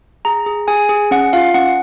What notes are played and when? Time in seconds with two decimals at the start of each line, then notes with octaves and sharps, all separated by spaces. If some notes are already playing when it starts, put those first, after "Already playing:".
0.25 G#4 A#5
0.46 G#4
0.68 G#4 G#5
0.89 G#4
1.11 C#4 F#5
1.33 F4 F5
1.54 C#4 F#5